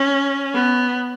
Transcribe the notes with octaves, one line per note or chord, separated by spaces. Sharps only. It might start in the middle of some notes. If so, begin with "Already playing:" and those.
Already playing: C#4
B3